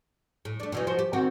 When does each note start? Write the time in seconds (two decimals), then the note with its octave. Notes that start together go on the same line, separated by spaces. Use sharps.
0.45 A2
0.60 A3 D4
0.72 B2 E3 D#4
0.87 F3 F#4 C5
0.99 G4
1.13 D#3 C4 F#4